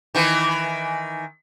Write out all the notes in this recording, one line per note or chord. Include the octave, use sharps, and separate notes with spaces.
D#3 E3